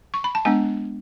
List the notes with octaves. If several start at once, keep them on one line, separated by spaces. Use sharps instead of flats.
C#6
B5
A5
G#3 B3 D4 G#5